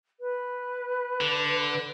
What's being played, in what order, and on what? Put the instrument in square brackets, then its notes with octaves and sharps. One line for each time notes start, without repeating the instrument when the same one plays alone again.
[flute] B4
[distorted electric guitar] D3